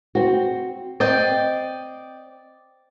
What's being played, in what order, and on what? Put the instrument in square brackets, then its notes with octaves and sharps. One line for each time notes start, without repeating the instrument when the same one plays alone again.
[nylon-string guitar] C4 F#4
[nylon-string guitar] C4 [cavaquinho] D5 D#5 G5